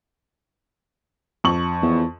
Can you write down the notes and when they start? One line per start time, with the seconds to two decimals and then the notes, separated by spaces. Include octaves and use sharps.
1.44 F2 C#6 F#7
1.82 E2